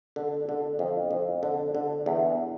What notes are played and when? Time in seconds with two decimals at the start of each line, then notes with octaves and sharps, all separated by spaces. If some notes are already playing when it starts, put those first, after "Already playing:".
0.16 D3
0.49 D3
0.79 F2
1.11 F2
1.43 D3
1.75 D3
2.06 E2